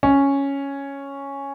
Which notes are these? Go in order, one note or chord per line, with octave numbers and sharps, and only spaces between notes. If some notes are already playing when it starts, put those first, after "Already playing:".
C#4